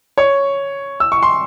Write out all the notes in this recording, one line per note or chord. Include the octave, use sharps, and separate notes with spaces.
C#5 C#6
E6
C#6
C6